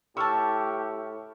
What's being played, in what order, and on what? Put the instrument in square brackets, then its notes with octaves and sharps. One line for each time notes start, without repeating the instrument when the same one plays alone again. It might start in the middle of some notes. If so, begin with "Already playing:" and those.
[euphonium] A2 [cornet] G4 [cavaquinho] E5 A5 [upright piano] C#6 E6 F6